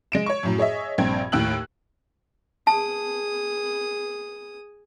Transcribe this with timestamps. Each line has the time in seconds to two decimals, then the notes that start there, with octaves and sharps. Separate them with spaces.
0.12 G#3 D7 E7
0.26 C#5 C#6
0.43 F#2 A2 F#3
0.58 G#4 C#5 D#5 E5
0.98 A#1 G2 C4 G5 G#6
1.32 D#2 A2 G5 E6 F#6 F#7
2.67 G#4 A5 D#6